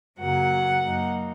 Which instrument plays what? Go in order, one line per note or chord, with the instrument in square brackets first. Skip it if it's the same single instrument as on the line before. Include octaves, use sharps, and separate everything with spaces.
[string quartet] F#2 C#3 F#3 A#3 F#5
F#2 F#3 A#3 D#4